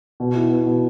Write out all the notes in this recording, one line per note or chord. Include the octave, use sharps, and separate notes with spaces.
B2
E4
B3
B2